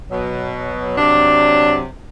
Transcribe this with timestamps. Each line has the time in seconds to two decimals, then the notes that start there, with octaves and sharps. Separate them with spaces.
0.10 B2 F#3
0.97 C3 F#3 D4